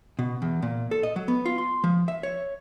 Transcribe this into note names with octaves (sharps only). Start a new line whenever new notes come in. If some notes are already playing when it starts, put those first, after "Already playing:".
B2
E2
A#2
A4
D#5
F#3
B3
F4
C6
F3
E5
C#5